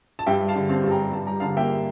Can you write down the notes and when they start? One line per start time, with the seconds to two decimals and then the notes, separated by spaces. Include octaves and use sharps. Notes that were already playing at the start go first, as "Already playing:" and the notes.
0.19 A5
0.26 G2 E5 G5
0.41 G3
0.48 F5 A5
0.55 D3
0.69 C4 F5 A5
0.84 G2 A5
0.91 G5 A#5
0.99 G3
1.12 G2 A5
1.27 G3 A#5
1.40 D3 F5 A5
1.57 A#3 E5 G5